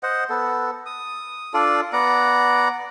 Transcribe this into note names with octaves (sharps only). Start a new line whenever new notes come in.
C5 D#5 F#5
B3 A4
D#6
D4 F4 A4 D5
B3 D5 F#5 A#5